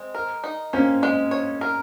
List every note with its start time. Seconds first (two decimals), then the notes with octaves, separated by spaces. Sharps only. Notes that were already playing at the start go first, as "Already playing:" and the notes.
Already playing: G#3 C4
0.15 A#4
0.44 D#4
0.73 A#3 C4 C#4
1.03 G#3
1.31 C#5
1.61 A#4